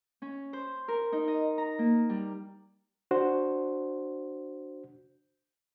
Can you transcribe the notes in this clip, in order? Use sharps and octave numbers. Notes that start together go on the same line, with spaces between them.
C#4
C5
A#4
D#4
D#5
A#5
A#3
G3
D4 F#4 C5